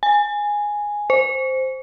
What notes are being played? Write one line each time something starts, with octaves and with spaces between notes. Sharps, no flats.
G#5
C5